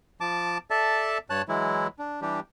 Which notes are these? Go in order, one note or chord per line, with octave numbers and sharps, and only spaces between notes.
F3 A5 D6
A4 D5 E5 A5
G2 C#5 A5 F#6
E3 F#3 G#3 E4
D4
E3 G3 D4 G4